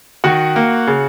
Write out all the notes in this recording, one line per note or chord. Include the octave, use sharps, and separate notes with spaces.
D#3 F#4 F#5
A#3
C#3